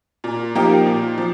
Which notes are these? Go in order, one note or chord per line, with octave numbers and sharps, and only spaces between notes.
A#2
F3 A#3 D#4 G4
A#2
F3